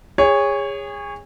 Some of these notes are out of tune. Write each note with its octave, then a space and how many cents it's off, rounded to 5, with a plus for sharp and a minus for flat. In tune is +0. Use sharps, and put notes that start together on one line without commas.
G#4 -30 C#5 +0